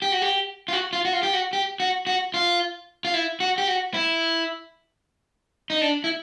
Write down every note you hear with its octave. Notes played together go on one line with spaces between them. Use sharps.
G4
F#4
G4
F4
F#4
F4
F#4
F4
G4
F#4
G4
F#4
F#4
F4
F4
E4
F#4
G4
F#4
E4
D#4
D4
E4